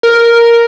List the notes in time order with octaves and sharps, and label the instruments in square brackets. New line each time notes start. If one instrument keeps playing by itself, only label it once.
[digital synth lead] A#4